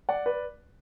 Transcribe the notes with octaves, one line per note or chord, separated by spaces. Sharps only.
D5 F#5
B4 D5